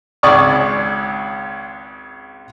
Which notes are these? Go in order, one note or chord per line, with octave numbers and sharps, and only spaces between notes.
G#1 C#2 D5 C#6 D#6